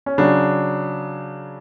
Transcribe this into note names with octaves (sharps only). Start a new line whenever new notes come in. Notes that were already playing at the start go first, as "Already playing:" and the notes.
C#4
C#3 F#3 D4